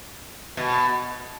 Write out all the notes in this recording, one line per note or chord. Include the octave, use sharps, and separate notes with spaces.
B2